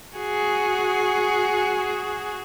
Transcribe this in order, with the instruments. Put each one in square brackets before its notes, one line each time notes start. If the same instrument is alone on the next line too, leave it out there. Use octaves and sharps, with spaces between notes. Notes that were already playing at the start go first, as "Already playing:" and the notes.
[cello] F#4 G#4